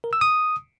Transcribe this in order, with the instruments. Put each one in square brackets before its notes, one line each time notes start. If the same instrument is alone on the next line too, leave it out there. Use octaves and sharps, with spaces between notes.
[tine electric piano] A#4
E6
D#6